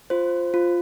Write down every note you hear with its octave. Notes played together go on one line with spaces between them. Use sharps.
F4 C5
F4